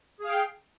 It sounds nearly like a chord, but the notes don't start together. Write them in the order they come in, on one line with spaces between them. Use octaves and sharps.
G#4 F5 G5